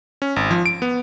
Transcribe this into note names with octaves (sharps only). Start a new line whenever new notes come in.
C#4
G#1
F3
D7
B3